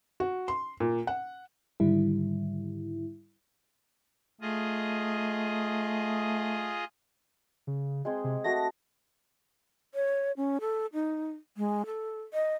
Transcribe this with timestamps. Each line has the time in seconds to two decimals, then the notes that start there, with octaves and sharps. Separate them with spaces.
0.20 F#4
0.48 C6
0.80 A#2
1.07 F#5
1.80 G#2 D3 D#3 G3 E4
4.41 A3 F4 G#4 D#5
7.67 C#3
8.05 G#3 C4 G#4
8.24 C3
8.44 A3 F#4 D#5 A#6
9.94 C#5
10.37 C#4
10.61 A4
10.93 D#4
11.57 G#3
11.86 A4
12.34 D#5